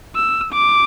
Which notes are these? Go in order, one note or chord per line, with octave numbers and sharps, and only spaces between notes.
E6
D6